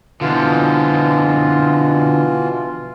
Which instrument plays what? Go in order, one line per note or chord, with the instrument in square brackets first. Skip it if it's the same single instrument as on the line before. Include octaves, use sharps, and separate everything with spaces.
[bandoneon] B2 E3 F4 [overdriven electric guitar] D3 F3